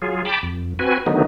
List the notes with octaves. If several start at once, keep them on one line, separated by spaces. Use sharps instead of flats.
F#3 F4 G#4
G5 A5 B5 D6
F2
C4 F#4 B4 G#5
D3 D#3 F#3 A3 B3 D#4